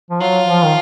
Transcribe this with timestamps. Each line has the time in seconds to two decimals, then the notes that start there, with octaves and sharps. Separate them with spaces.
0.10 F3
0.21 F#3 F4
0.48 F3
0.64 D#3